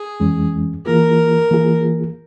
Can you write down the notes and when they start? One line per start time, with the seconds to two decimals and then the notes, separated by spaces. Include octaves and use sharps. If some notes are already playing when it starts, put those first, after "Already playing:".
Already playing: G#4
0.20 F2 E3 G#3 C#4
0.86 E3 A#3 F4 G#4 A#4
1.51 E3 A#3 F4 G#4